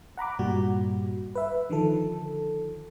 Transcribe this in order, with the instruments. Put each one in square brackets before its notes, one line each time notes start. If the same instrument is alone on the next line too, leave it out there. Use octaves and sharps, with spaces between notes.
[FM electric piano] F#5 A#5 B5 D6
G2 A#2 G3 F#4
B4 E5
D3 D#3 F3 A4